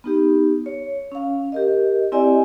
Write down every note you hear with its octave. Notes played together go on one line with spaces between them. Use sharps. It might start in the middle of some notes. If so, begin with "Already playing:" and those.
B3 D#4 G4
C#5
C#4 F5
G4 A#4 D#5
C4 E4 G4 D5 D#5 G#5